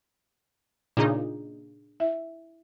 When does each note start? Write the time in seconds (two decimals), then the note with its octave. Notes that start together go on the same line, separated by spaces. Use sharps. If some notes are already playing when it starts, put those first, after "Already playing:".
0.97 A#2 C#3 D4 D#4 G#4
2.00 E4 E5